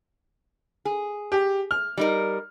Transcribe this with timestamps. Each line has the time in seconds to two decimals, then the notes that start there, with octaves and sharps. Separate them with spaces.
0.85 G#4
1.32 G4
1.71 F6
1.97 G3 D#4 A#4